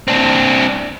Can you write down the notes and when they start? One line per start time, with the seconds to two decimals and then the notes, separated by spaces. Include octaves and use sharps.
0.08 C4 D4